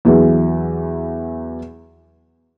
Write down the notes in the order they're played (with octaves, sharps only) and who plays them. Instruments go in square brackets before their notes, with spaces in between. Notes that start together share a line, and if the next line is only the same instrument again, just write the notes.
[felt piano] E2 E3 F#3